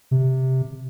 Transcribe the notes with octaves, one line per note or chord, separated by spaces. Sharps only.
C3